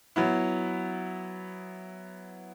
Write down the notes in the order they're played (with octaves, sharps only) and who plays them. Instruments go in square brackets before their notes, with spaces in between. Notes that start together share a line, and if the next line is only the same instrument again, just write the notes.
[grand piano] F#3 B3 E4